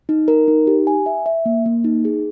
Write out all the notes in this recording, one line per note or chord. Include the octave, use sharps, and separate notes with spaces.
D#4
A#4
D#4
G4
G#5
E5
E5
A#3
A#3
D#4
G#4